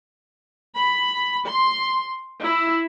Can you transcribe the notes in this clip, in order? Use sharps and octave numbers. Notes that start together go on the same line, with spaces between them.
B5
C6
E4